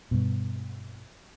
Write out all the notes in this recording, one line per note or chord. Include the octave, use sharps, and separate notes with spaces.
G2 B2